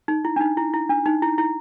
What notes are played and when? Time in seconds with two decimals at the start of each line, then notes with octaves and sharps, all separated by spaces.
0.08 D#4
0.25 E4
0.36 D4
0.41 D#4
0.57 E4
0.74 E4
0.89 D4
1.06 D#4
1.22 E4
1.38 E4